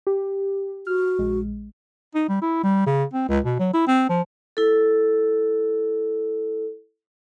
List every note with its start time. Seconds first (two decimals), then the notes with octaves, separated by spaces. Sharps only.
0.07 G4
0.87 F#4 F6
1.19 A#1 G#3
2.15 D#4
2.28 G3
2.42 E4
2.63 G3
2.86 C#3
3.13 C4
3.29 C#2
3.44 B2
3.59 F#3
3.73 E4
3.87 C4
4.09 F3
4.57 E4 A4